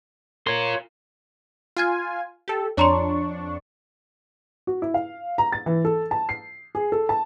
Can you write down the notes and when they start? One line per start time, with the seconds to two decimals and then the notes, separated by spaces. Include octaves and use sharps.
0.47 F4 A#4 C#5 C6
1.77 F4 G#5 F6 G#6
2.48 G4 A4
2.77 F2 D4 C#5 A#5 C6 C#6
4.67 F#4
4.82 E4
4.94 F5
5.38 A#5
5.52 A6
5.66 E3
5.85 A4
6.11 A5
6.29 C7
6.75 G#4
6.92 A4
7.09 A5